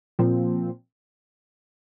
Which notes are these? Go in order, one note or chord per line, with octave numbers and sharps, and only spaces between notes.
A#2 F3 C4